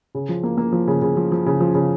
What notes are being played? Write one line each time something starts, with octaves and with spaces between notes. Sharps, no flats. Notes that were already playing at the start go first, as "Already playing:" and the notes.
C#3
F3
A#3
A#3
F3
C#3
C#3
F3
F3
C#3
F3
C#3